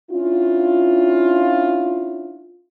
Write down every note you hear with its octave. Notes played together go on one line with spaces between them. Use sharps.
C#4 D4 E4 F4